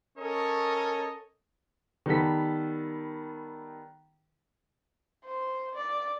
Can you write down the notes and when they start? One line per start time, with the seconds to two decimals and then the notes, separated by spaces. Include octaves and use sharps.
0.18 C#4 A4 A#4 C#5 D#5
2.06 D#3 G3 B3 A4 B6
5.25 C5
5.75 D5